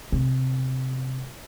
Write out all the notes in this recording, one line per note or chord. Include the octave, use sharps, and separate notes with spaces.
C3